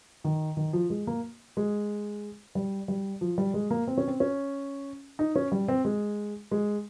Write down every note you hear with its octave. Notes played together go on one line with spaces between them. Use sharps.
D#3
D#3
F3
G#3
A#3
G#3
G3
G3
F3
G3
G#3
A#3
C4
C#4
C4
C#4
D#4
C#4
G3
C4
G#3
G#3